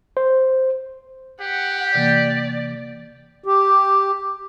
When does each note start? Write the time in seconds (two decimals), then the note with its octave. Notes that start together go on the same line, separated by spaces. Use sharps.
0.17 C5
1.41 G4 F#5
1.94 C3 E3 A#3 D5
3.44 G4